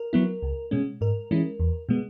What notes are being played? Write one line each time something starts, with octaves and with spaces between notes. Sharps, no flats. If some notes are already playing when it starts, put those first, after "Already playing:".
Already playing: A#4
F#3 B3 E4
C#2
B2 G#3 C#4
G#2 A#4
E3 G#3 C#4 E4
E2
B2 G#3 B3